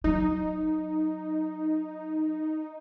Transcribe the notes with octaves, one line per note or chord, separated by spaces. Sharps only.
F#3 D#4